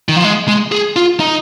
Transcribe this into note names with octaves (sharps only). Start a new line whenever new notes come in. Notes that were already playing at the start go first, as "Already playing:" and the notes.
D#3
F3
G#3
G#3
G#4
F4
D#4